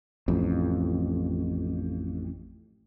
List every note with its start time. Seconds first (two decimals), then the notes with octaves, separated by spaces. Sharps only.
0.28 A1 F2